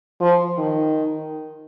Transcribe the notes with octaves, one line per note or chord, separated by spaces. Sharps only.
F3
D#3